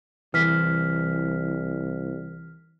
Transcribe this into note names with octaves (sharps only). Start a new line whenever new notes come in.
C2 E3 F6 B6